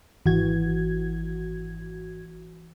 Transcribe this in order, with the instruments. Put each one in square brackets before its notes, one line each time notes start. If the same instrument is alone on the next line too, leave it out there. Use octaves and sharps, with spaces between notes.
[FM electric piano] G#1 F#4 G#6 [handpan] E3